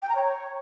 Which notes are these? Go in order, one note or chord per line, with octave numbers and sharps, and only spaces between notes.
G5
A#5
C#5